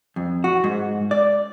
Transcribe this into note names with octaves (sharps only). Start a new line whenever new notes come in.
F2
F#4
G#2
D5